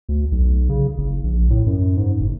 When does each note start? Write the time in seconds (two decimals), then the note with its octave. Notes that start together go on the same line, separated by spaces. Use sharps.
0.09 D2
0.32 B1
0.69 C#3
0.98 F#1
1.24 A#1
1.50 A2
1.66 F#2
1.97 G#2
2.20 F#1